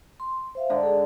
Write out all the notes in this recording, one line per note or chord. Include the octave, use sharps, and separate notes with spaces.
C6
C5 E5 F5
G#2 D3 A#5
G#4 A4